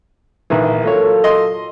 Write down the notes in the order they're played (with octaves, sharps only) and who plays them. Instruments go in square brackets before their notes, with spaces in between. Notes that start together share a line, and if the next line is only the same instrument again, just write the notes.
[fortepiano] A#1 D#3 E3
[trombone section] F#3 F4 A4 [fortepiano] A#3 C#5
[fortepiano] D#5 C6